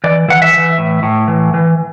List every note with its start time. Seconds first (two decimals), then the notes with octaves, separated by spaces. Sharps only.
0.04 E3 D5
0.28 E3 F#5
0.42 E5
0.53 E3
0.78 A2
1.03 A2
1.28 E3
1.54 E3